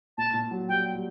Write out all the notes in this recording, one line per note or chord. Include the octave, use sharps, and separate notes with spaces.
A#2 A5
A#2
F#3
G3 G5
G3